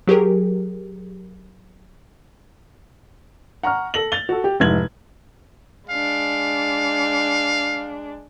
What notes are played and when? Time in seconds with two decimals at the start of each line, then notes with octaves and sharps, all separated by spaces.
0.07 F#3 G4 G#4 A#4
3.63 F#5 A#5 C#6 F6
3.94 A4 A#6 F#7
4.12 A6 F7 G7
4.29 F#4 A4
4.44 G4
4.60 F1 G#2 E4 G#6 F#7
5.90 G#3 D4 F5